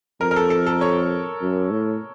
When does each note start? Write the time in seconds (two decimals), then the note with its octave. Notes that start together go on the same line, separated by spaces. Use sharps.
0.21 F2 A#4
0.31 A#4
0.36 A4
0.50 A4
0.66 A4
0.81 C#5
1.41 F#2
1.71 A2